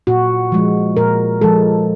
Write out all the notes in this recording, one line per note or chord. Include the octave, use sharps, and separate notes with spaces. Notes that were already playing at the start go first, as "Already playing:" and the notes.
A#2 F#4
F3 G#3
A#2 A#4
F3 G#3 A4